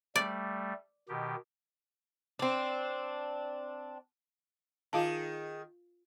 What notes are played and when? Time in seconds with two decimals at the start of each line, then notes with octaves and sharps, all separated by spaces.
0.16 G3 A3 D5
1.09 B2 D#3 G4
2.39 C4 D4
4.93 D#3 F4 G#4 F5 A5